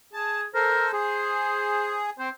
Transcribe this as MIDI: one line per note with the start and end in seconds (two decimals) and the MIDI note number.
0.13 0.45 68
0.13 0.41 81
0.55 0.92 69
0.55 0.87 70
0.55 0.92 72
0.93 2.10 68
0.93 2.07 72
2.19 2.29 60
2.19 2.29 72